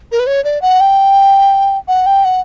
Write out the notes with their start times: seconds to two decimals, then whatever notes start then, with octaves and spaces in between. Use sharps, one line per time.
0.12 A#4
0.20 B4
0.27 C#5
0.44 D5
0.62 F#5
0.80 G5
1.88 F#5
2.06 G5
2.25 F#5